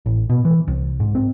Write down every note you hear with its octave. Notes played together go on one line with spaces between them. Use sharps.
A1
B2
E3
C2
G#2
C4